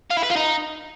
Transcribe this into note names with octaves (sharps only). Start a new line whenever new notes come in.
F4
E4
B4
F4
D#4